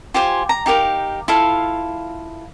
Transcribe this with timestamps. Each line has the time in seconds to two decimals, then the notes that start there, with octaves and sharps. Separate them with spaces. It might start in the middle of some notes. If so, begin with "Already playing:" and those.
0.14 F4 G4 C5 G#5
0.49 A#5
0.66 D#4 G4 A#4 F5
1.28 E4 F4 A4 F5